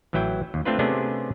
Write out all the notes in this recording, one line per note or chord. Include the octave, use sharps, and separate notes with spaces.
A1 E3 F#3 E4 G5
D#2
A3 C4 D4 F4 B4
C3 A3 B3 C#4 D4 G#4